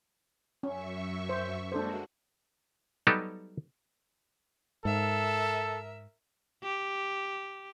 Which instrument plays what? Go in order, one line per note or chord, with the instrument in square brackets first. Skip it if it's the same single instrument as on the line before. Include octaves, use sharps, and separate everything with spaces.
[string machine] F#2 E5 C#6 [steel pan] C#4
[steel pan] C5
[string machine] G#3 A#3 F#4 [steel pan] D4 A4 C5
[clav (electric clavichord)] F#3 G3 B3 D#4 G4 A4
[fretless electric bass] G#2 [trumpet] A4 [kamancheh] A#4 E5
[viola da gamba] G4